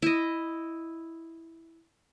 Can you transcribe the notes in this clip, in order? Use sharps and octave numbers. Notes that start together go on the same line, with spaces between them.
E4 D#5